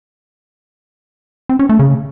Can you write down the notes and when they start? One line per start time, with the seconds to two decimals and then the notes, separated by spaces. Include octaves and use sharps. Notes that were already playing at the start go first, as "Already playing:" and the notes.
1.49 C4
1.59 C#4
1.69 A3
1.79 C#3